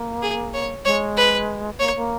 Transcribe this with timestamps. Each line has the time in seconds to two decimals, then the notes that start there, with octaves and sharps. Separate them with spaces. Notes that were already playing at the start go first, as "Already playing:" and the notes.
Already playing: A#3
0.22 G#4
0.54 C#5
0.85 G#3 C#5
1.17 B4
1.80 A#3 C#5
1.96 A#3